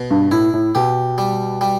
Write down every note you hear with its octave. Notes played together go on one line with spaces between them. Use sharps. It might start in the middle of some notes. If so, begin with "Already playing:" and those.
Already playing: B2
G2
A2 E4
A2
B2 G4
G3
G3